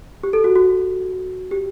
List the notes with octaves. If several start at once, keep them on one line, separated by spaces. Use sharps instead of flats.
G4
A4
F#4
F#4
G4